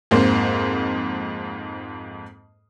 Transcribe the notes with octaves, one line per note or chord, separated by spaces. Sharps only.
F2 G#2 A#3 C5